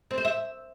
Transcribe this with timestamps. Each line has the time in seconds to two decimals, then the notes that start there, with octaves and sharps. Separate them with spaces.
0.11 C4
0.18 C5
0.25 E5